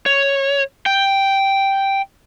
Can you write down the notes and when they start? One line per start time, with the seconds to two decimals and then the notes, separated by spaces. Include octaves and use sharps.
0.06 C#5
0.86 G5